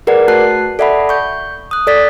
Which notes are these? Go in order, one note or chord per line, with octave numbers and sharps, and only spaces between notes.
G#4 A#4 B4 D5 F#5
A3 F#4 A5 F#6 C7
A4 D5 E5 F#5 A5 B5
C#6 G6
D#6 F#6
A4 D5 A6 B6